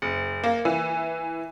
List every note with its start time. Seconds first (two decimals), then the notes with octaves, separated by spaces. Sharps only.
0.02 F#1
0.44 A#3
0.65 E3